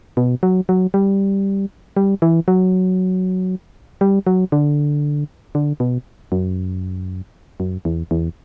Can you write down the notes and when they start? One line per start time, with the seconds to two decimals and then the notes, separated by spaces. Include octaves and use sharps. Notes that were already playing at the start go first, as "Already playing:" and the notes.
0.17 B2
0.43 F#3
0.69 F#3
0.94 G3
1.97 G3
2.22 E3
2.48 F#3
4.01 G3
4.27 F#3
4.52 D3
5.55 D3
5.80 B2
6.32 F#2
7.60 F#2
7.85 E2
8.11 E2